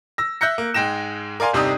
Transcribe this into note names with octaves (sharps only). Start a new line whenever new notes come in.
E6 A#6
E5 F#6 G6 A#6 C#7
A#3
G#2 G#3 G5 A#6 E7
A#4 D5 F5 G#5 C6
G1 C3 D4 D#4 G4 D#6